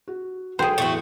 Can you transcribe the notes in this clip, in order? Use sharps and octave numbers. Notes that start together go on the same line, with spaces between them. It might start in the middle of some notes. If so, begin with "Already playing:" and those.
F#4
F#3 G#4 A4 C5 G5
A1 E2 E3 A3 F#4